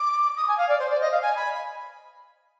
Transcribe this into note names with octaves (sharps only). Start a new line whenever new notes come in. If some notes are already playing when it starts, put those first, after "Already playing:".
Already playing: D6
D#6
G#5
F5
D5
C5
D5
D#5
F5
G#5
B5